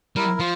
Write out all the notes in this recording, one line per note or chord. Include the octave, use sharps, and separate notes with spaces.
G3 E4 A#4
F3 F4